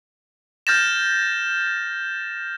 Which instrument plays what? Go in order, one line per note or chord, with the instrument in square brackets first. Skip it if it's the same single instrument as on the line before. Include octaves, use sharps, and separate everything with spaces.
[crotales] F6 G6 A6 A#6 E7